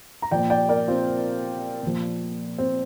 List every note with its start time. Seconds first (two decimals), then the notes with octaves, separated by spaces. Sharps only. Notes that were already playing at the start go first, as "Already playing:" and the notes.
0.22 A#5
0.31 A#2 F3 D5 G5
0.50 D5 G5
0.69 A#4 D5
0.88 C4 F4
1.83 A#2 F3
2.59 C4